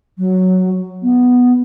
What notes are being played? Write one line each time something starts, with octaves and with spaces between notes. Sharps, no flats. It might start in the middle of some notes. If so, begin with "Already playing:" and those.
F#3
B3